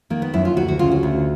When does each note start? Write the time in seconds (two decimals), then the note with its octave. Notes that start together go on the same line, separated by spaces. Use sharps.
0.10 D#3 A#3
0.22 B3
0.34 F#2 E4
0.45 F4
0.57 D2 F#4
0.68 F#4
0.79 C#3 F4
0.91 F#4
1.03 D2